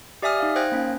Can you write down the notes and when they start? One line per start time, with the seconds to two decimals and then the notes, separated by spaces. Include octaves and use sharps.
0.22 G4 D5 E5 G#5 D#6 F6
0.40 D#4 F5
0.56 C5 F5 G5 F#6 G#6 A#6
0.72 A#3 C#4